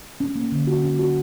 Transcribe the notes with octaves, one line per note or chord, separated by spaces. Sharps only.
C#4
A#3
D3
F#4
C#4
F#4